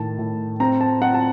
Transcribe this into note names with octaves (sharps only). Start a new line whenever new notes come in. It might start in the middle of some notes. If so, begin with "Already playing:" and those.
Already playing: A2 D#3 A5
A2
C4 A#5
A5
C4 F#5
A5